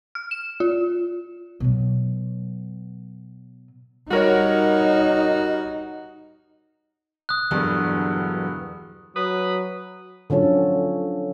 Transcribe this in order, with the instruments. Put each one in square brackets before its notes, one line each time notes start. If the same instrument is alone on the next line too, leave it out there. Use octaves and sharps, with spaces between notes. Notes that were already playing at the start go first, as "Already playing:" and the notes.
[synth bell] F6
E7
F4
[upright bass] B2 F#3
[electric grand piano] G3 A#4 C#5 [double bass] D#4 [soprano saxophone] F#4
[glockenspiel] D#6 F#6
[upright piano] E1 G2 [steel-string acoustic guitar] D3 E3 F#3
[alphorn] F#3 [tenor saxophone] B4 [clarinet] D#6
[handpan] D3 F3 F#3 C#4 A4